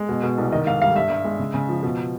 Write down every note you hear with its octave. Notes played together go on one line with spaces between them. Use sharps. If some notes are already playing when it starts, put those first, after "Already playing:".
Already playing: G#3
B2
B2
C2
D#3 D#5
G#2 F5
G3 F5
G2 E5
G2
G#3
C#3
C#3
F3
B2